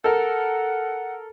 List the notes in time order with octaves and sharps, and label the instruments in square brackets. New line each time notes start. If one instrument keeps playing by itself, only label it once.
[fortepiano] A4 A#4 [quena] F#5